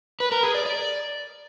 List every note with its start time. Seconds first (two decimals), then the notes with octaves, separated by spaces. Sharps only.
0.20 B4
0.32 A#4
0.43 G#4
0.54 D5
0.66 D5